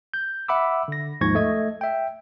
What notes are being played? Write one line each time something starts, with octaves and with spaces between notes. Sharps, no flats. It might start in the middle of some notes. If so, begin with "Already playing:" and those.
G6
E5 F#5 B5 D6 E6
D3 A#6
D#2 G#2 F3 C#6 G#6 A#6
A3 D#5 G#6
E5 G5